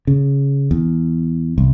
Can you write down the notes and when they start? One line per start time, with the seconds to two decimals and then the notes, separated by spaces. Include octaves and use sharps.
0.07 C#3
0.71 E2
1.58 C2